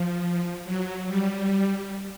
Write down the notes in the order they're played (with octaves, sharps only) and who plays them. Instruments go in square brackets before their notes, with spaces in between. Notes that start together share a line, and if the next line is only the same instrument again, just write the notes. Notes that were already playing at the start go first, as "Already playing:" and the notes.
Already playing: [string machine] F3
F#3
G3